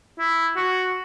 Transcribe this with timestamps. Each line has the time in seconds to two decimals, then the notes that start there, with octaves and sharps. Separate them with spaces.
0.19 E4
0.56 F#4